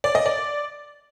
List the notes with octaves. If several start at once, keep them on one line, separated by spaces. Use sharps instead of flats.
D5
D#5
D5